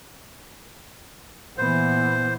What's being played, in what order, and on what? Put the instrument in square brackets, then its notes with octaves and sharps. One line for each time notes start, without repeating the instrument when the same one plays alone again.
[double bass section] A#2 E3 B3 [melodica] C5